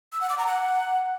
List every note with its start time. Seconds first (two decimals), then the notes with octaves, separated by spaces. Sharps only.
0.12 E6
0.21 F#5
0.29 D6
0.38 A#5
0.46 F#5